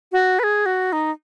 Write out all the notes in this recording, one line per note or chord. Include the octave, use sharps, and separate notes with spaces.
F#4
B4
G#4
F#4
D#4